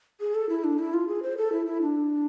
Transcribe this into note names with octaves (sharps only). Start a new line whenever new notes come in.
G#4
A4
E4
D4
E4
F4
G#4
C5
A4
E4
E4
D4